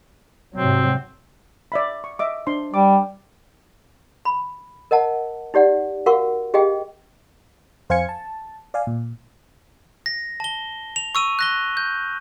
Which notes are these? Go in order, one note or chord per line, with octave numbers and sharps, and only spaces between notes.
G#2 C3 F#3 C4
D5 E5 B5
C#6
D#5 E5 D6
D4 C5 C6
G3 D6
B5
A#4 D#5 F#5 A5
D#4 G4 D5 F#5
F#4 A#4 F5 F#5 C#6
G4 G#4 D#5 F5 G5
F2 C5 F5 G#5 G#6 C#7
A5
D5 F5 G#5
A#2
A#6
A5 G7
F7
C#6 E6 D#7
F#6 A#6 G7
G6